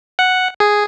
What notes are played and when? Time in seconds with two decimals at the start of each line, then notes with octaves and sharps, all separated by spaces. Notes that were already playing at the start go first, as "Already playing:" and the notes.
0.19 F#5
0.60 G#4